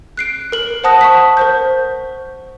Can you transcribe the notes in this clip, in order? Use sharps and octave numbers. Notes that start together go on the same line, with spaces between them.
F#6 C7 D7
A#4 F#7
C5 F#5 A5 D#6 F#6 A#6
C#6 B6
A#4 C5 G6